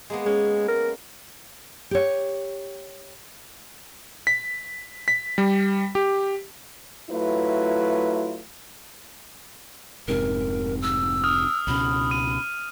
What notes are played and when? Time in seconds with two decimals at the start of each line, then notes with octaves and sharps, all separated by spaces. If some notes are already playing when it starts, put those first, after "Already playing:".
0.10 G#3 A#3 B3
0.26 G#3 C#4
0.68 A#4
1.91 G4 C#5
4.27 B6
5.08 B6
5.38 G3
5.95 G4
7.10 F#3 A3 E4 F4 B4
10.08 F1 G#2 C3 A#4
10.82 E6
11.24 D#6 F6
11.67 C#2 B2 C#4 B5
12.11 D#6 D#7